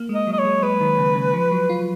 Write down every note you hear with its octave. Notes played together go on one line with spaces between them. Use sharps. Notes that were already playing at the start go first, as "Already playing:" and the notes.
Already playing: A#3
G#3
D#5
F#3
D#5
C#5
G#3
G#3 B4
D#3
C#3
C#3
F3
F#3
F4